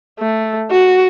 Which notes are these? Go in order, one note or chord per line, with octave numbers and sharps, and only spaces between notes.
A3
F#4